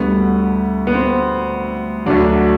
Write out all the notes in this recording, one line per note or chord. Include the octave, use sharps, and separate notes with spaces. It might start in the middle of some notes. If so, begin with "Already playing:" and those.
Already playing: D2 D3 G3 B3
B3
C4
D2 D3 F#3 D4